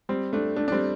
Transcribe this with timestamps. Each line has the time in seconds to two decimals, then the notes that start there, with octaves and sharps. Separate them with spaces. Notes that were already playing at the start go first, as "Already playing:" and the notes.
0.09 G3 C4
0.33 A3 D4
0.56 A3 D4
0.68 D4
0.72 G3 C4